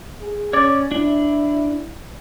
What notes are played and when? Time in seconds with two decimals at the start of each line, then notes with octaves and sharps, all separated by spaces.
0.20 G#4
0.53 C#4 C#5 D5
0.92 D4 E4